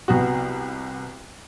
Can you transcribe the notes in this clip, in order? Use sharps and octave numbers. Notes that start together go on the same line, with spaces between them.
C2 B3 F#4